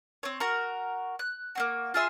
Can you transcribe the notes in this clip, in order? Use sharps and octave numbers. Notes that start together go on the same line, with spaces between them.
C4 C#5
F#4 A#4
F#6
A#3 C4 F#4
F4 G#4 E5 C6